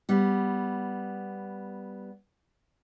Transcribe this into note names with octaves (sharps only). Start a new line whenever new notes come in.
G3 B3